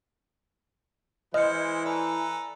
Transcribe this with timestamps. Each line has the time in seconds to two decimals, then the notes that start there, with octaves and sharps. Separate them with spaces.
1.34 E3 G#3 E4 C5 D#5 F6 C#7
1.85 A4 B4 D5 G#5 A#5